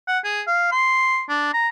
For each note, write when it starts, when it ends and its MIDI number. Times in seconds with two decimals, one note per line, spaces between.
0.08 0.19 78
0.25 0.42 68
0.47 0.69 77
0.72 1.23 84
1.29 1.51 62
1.54 1.69 82